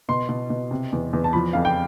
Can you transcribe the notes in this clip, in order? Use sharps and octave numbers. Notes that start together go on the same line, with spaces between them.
B2 C6
B2
B2
C3
E2
E2
A5
F3 B5
F2 F5
G5